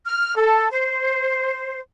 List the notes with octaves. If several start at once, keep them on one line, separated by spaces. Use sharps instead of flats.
F6
A4
C5